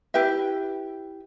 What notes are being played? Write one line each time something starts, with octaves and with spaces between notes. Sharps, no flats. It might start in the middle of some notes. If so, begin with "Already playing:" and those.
E4 G4 B4 E5